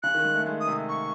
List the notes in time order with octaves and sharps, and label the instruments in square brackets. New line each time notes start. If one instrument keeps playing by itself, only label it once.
[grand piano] C#3 [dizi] F#6
[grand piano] D#3
G#3
A3
G#3
[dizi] D#6
[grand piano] C3
[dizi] C#6